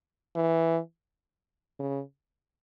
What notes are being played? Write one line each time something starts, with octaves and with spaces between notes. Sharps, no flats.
E3
C#3